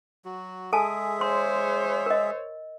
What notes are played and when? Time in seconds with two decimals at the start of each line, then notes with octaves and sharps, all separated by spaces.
0.25 F#3 F#4
0.73 G#3 G#4 A4 E5 G#5 A5
1.21 C5 C#5 C6
2.06 A#4 D#5